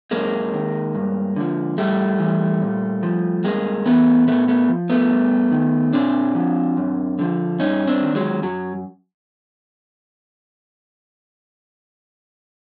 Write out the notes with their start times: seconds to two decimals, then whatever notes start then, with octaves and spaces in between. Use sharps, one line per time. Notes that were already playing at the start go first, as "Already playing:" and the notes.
0.11 F#2 G#3 A#3
0.53 D#3
0.95 G2
1.36 D3 F3
1.78 A2 G3 A3
2.19 E3
2.62 A#2
3.03 F3
3.44 G2 G#3 A#3
3.86 E3 A3 B3
4.27 A#2 A3 B3
4.48 A3 B3
4.69 F3
4.90 A3 B3
5.11 G2
5.51 D#3
5.93 A#2 C4 D4
6.34 F3
6.77 F#2
7.19 D3 F3
7.59 G2 C#4 D#4
7.87 C4 D4
8.01 D#3
8.15 F#3 G#3
8.42 F#2 F#3